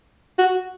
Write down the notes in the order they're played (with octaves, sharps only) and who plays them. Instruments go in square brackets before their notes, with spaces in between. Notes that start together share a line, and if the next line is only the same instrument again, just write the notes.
[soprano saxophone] F#4